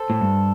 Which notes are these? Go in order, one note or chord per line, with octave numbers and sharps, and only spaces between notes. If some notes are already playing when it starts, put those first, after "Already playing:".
Already playing: A4 C5
A2
G2